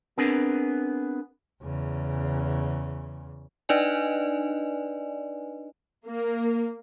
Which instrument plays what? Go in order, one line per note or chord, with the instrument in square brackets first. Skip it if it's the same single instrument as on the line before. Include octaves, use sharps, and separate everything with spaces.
[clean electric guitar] B3 C4 D4 G#4 A#4 B4
[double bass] E2 C#3
[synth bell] D4 D#4 B4 D5 D#5 G#5
[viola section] A#3